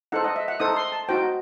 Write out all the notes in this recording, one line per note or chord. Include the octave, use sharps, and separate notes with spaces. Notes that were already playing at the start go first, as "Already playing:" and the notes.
D#4 A4 C5 F#5
D#5
E5
F#5
D#4 A4 C5 D#6
C6
A5
D#4 F#4 C5 G5